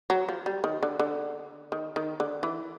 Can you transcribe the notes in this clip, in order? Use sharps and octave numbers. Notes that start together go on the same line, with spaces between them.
F#3
F3
G3
D#3
D3
D3
D#3
D#3
D3
E3